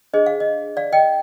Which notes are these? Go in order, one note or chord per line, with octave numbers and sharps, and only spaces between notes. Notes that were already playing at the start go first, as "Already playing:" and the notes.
D4 G#4 C5 D#5
F5
D#5
D5 F5
D#5 G5